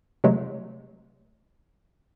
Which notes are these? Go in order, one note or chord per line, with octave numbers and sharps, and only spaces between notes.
C3 E3 F#3 G#3 A3